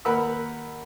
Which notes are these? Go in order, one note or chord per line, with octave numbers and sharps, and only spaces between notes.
D#2 A#4 B4 F#5 B5 E6